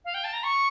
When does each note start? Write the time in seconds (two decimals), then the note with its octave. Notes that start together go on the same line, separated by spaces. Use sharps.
0.05 F5
0.14 G5
0.24 A5
0.33 A#5
0.43 C#6